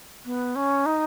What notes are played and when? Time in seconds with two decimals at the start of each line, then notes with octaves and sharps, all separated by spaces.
0.25 B3
0.55 C#4
0.85 D#4